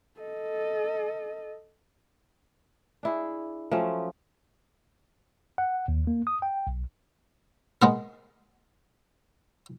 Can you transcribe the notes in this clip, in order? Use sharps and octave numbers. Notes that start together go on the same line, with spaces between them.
A4 D#5
D4 E4 G#4
F3 F#3 A3 C#4
F#5
D#2
A#3
D#6
G5
B1
G#3 B3 A#4